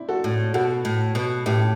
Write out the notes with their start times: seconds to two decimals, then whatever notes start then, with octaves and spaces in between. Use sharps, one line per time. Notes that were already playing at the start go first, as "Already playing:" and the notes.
Already playing: C4 D4 E4
0.09 F#4 A4
0.24 A2
0.54 B2 F#4 A4
0.85 A2
1.15 B2
1.46 A2 E4 G4